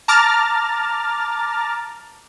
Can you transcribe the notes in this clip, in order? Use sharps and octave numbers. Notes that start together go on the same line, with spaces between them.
A5 A#5 D6 F6 A6